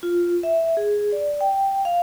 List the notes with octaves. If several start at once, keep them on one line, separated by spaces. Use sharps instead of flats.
F4
E5
G#4
D5
G5
F5